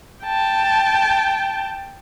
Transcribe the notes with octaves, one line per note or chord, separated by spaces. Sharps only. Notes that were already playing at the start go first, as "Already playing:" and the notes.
G5 A5